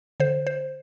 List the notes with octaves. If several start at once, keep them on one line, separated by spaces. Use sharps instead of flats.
D3 C5
C5